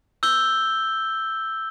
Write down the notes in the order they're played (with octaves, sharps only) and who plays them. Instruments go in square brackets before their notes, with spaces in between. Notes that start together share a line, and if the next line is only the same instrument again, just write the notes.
[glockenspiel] E6 G6 G7